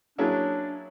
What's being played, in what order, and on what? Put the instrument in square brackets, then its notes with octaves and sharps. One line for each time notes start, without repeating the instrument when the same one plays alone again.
[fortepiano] F#3 A#3 C#4 E4 G#4 [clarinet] D4